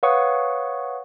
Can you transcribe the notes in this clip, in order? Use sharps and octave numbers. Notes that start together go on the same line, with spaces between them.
B4 C#5 F5 F#5 C#6 D#6